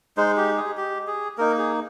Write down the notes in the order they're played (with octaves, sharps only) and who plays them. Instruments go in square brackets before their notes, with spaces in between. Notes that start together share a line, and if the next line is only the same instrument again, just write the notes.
[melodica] G#3 D#4 C5
G4
G#4
G4
G#4
A#3 D#4 A#4
G#4